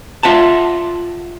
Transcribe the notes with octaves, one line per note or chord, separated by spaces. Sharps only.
F4 E5 F#5 A5